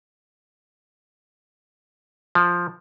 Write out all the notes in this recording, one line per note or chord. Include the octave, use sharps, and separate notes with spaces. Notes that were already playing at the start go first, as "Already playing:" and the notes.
F3